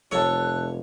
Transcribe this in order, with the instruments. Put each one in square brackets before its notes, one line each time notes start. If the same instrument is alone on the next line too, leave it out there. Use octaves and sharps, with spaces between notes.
[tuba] F1 [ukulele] A4 A5 [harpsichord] C#5 [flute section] F#6